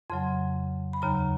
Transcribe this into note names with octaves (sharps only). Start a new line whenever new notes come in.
F2 C#3 F#3 C6
B5
D#2 C#3 F#3 A#5